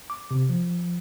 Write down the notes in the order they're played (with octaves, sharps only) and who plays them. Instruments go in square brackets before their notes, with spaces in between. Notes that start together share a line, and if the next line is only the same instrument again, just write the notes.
[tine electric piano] D6
C3
F3